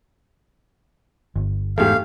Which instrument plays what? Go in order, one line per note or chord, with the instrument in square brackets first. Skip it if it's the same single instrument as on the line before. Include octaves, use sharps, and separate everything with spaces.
[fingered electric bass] G1
[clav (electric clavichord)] E2 G#2 [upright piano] A3 G4 [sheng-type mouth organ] F5